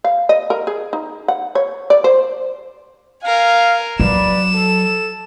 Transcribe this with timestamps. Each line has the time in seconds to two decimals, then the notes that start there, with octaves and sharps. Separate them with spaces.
0.04 F5
0.29 D#5
0.50 A#4
0.67 G#4
0.93 D#4
1.28 F#5
1.55 C#5
1.90 D5
2.04 C5
3.24 A#4 F5 G#5
4.00 F#3 B4 D5 E7
4.54 A4